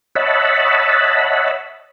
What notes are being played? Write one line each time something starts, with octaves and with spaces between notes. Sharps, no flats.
C#5 D#5 E5 F#5 A5 B5